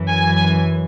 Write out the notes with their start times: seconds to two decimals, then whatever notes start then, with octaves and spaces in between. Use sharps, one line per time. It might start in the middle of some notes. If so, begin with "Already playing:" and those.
Already playing: F#2 E3
0.09 G#5